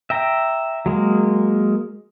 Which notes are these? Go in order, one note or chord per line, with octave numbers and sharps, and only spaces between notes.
E5 G5 A#5
F#3 G#3 A#3